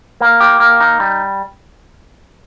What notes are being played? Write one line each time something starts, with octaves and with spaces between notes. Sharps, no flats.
A#3
G4
A#3
D#4
G3